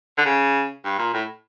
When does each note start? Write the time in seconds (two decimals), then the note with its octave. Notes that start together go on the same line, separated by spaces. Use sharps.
0.18 D3
0.25 C#3
0.85 G2
0.98 A#2
1.14 A2